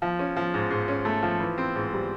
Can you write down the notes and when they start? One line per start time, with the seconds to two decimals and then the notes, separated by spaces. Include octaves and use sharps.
0.02 F3
0.19 C#4
0.36 F3
0.54 G#2
0.70 G#2
0.88 C#4
1.05 A3
1.23 F3
1.40 E3
1.58 C4
1.75 G#2
1.93 G3